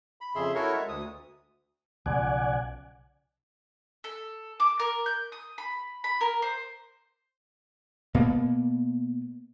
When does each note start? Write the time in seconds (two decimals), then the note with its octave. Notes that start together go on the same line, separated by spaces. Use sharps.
0.21 B5
0.35 F2 C#3 G#4 E5 C6
0.55 E4 F#4 A4 A#4 C#5 C#6
0.73 G#3 E5
0.88 D2 D#6
2.06 B1 C#3 F3 D5 F#5 G#5
4.04 A4
4.60 D6
4.80 A#4
5.06 G6
5.32 D#6
5.58 B5
6.04 B5
6.21 A#4
6.42 C5
8.14 B2 A#3 B3